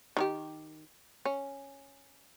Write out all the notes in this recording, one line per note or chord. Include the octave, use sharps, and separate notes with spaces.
D#3 D#4 G4
C#4